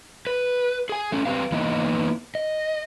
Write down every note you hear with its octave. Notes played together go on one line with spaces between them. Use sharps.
B4
G#4 G#5
A3 C#4
C4 G4 B4 F5
E3 A#3 B3 D#4 E4 D#5
D#5